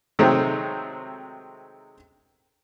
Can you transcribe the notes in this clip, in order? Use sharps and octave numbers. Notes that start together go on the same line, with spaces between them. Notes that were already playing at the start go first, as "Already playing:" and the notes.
C3 D#3 F#3 G#3 A3 C4